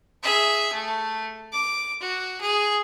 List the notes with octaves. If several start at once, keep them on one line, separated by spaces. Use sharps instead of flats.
G#4 E5
A3
D6
F#4
G#4